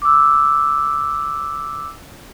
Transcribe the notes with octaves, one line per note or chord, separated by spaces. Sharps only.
D6 E6